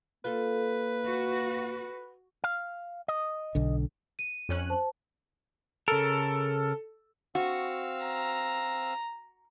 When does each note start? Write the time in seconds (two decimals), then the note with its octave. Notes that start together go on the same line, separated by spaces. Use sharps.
0.25 A#3 F4 A4 B4
1.05 F#4
2.44 F5
3.08 D#5
3.55 B1 D3
4.19 D#7
4.49 F2 C#4 F#6
4.70 C5 A5
5.88 C#3 A4 A#4
7.35 C4 F#4 F5 E6
8.05 A#5